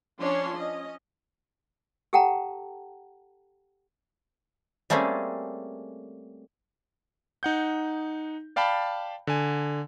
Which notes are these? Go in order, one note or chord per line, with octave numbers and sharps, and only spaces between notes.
F3 C#4 D4 C#5 C6
C#4 D#5
G4 A4 F#5 G5 A5 A#5
G3 A3 A#3 C4 C#4 G#4
D#4 F#5 G6
D5 F5 G5 A5 B5
D3 G#5